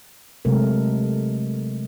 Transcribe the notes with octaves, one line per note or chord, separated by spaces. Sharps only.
C3 F#3 G#3 A3 A#4